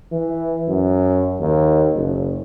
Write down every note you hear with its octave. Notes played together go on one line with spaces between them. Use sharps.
E3
F#2
D#2
F#1